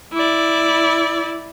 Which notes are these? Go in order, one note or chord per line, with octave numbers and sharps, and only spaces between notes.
E4 D5